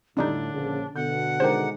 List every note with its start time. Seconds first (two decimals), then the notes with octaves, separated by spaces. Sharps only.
0.17 F2 A2 D3 G3 D4 D#4
0.53 A#1 C#3
0.96 B2 D3 F#5 G6
1.40 D#3 G#3 D4 D#4 C5